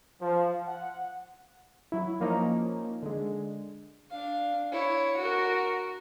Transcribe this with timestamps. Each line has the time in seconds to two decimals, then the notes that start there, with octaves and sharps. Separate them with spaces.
0.21 F3
0.67 F#5
1.92 F#3 E4
2.20 F3 A#3 C#4 D#4 F4
3.03 D3 G#3
4.10 D4 F5
4.72 E4 C#5
5.17 F#4 A#4